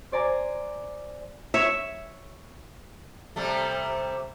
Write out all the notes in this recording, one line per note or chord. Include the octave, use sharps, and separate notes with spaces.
C5 D5 G#5 A#5
C#5 E5
C3 G3 A3